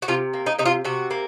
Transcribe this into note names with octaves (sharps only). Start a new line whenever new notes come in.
F#4
C3 F4
A#3
D#4
C3 D#4
F4
C3 F#4
A#3